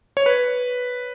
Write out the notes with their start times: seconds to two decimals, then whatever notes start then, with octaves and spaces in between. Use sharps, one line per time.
0.17 C#5
0.26 B4